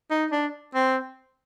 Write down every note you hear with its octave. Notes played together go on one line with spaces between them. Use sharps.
D#4
D4
C4